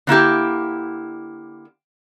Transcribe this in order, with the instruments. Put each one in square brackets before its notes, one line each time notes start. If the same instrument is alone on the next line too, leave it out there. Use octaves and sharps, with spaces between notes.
[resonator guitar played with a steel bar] D3 A#3 E4 G4